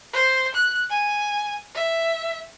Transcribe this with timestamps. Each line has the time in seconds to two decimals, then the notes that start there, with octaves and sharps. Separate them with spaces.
0.13 C5
0.55 F#6
0.90 G#5
1.75 E5